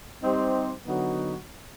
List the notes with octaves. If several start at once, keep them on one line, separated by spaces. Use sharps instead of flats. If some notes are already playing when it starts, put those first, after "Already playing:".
G3 C4 D#4 G4 C5
D3 F#3 B3 D#4 F#4